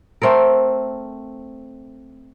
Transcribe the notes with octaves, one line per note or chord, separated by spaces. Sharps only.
A3 C4 A4 A#4